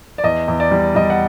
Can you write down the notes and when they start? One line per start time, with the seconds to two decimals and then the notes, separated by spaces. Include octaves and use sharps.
0.18 D5
0.24 E2 D#5
0.48 E2
0.60 D5
0.71 G3
0.95 G3 D#5
1.10 F#5